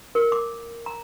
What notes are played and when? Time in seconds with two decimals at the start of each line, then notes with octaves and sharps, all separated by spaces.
0.15 A#4
0.32 D6
0.86 A#5